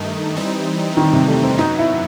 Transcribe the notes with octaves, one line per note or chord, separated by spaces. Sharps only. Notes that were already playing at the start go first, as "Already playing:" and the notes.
Already playing: G2 D#3 A3 D#4
E3 G3 C4 D#4
D#3
C3
A3
C4
F#2 F#3 B3 D#4
E4